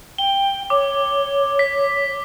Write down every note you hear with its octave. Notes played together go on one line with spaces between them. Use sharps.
G5 G7
C#5 D6
B6